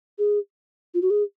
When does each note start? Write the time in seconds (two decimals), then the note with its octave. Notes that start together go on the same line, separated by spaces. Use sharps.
0.19 G#4
0.94 F4
1.02 F#4
1.10 G#4